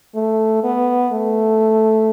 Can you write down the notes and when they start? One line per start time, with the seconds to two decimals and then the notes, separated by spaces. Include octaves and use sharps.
0.15 A3
0.64 B3
1.13 A3